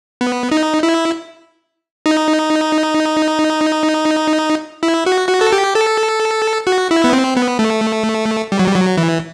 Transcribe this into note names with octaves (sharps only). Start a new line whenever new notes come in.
B3
D#4
E4
D#4
E4
F#4
F#4
A4
G4
A4
F#4
E4
B3
C4
B3
A3
G3
F#3
G3
F#3
E3